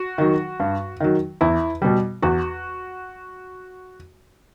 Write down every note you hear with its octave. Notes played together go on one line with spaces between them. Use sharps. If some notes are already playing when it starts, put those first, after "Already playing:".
Already playing: F#4
D#3 F#3
G2
D#3 F#3
E2 E4
B2 G3
E2 F#4